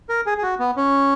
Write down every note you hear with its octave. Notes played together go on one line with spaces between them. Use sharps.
A#4
G#4
G#4
F#4
B3
C#4